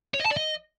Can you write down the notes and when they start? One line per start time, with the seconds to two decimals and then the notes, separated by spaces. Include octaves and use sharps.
0.14 C#5
0.20 D#5
0.25 A5
0.31 D5
0.37 D#5